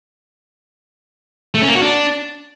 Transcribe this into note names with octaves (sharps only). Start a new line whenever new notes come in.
A3
C#4
A#3
F#4
D4